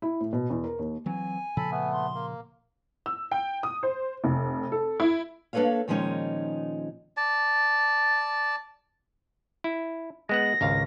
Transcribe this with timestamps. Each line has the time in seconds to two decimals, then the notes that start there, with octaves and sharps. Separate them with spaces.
0.02 E4
0.20 A2
0.33 B2
0.50 E2
0.64 A#4
0.79 D#2
1.06 E3 F#3 C4 G#5
1.57 A#2 C#3 F3 A4 B5
1.72 A3 B3
1.92 C6
2.15 A#3
3.06 E6
3.31 G5
3.63 D#6
3.83 C5
4.24 F1
4.72 A4
5.00 E4
5.53 A#3 D4 A4 B4 C#5 F5
5.88 A#2 D#3 F3 G#3 C#4 D#4
7.17 D5 A5
9.64 E4
10.29 G#3 B3 F#5 A#6
10.61 G#1 C#2 F5